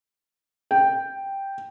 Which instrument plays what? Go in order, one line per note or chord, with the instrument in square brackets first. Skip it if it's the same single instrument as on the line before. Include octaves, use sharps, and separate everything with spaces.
[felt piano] G5